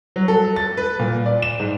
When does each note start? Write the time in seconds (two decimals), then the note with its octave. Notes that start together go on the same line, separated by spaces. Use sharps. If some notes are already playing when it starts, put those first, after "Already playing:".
0.16 F#3
0.28 A4
0.56 A6
0.77 B4
0.99 A#2
1.26 D5
1.42 E7
1.60 G#2